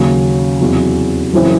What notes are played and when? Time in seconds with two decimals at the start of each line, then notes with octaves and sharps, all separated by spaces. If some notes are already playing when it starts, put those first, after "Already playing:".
Already playing: D#2 C#3 F#3 C#4 G#4
0.61 E2 C3 F#3
1.33 F#1 F#2 C#3 E3 C4